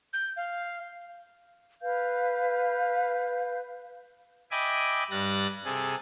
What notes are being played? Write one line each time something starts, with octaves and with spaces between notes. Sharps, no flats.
G6
F5
B4 F5 G6
D#5 E5 G5 G#5 B5 D6
G2 G3 F#6 A6 A#6
C3 G#4 A4